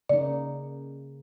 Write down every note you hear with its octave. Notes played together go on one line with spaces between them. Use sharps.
C#3 A#3 D#4 D5